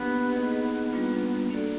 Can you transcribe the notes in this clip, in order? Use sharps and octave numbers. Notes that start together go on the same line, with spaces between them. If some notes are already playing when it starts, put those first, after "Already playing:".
Already playing: A#3 B3 D4 G4
A#3 D#4 G#4 B4 D#5
G3 A#3 D4 F4
A#3 D4 F#4 A4 D5